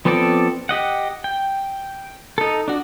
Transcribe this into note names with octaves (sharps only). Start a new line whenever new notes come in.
F3 B3 C4 A4 D5
G4 D#5 F#5
G5
D#4 A4
D4 F#4